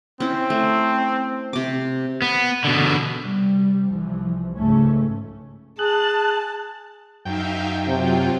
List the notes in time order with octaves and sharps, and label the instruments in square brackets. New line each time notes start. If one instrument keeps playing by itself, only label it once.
[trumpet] C4 [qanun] C#4 E4
[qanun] A3
C3 D6
[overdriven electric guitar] B3
B2 D3
[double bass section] C3 G3
C2 E3 F3
C#2 G#2 C#3 A3 C#4
[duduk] G#4 [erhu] A5 [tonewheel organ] F#6
[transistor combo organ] F#2 G5 [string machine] D#4 E5 F5
[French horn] C3 [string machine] F#3 F4